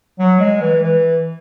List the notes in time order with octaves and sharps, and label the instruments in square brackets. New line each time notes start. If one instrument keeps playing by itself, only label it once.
[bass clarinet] F#3
G#3
E3
E3